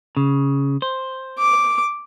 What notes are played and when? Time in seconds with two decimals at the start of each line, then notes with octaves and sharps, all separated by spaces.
0.17 C#3
0.82 C5
1.39 D6